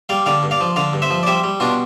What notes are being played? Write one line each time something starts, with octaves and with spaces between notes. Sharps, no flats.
G3 D5 F5
D3 D5 F5
G2
D5 F5
F3
D3 D5 F5
G2
C5 E5
F3
D5
G3 C5 E5
G3
B2 D4 F4